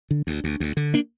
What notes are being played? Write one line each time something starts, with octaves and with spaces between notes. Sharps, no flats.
D3
D2
D2
D2
D3
A#3 D4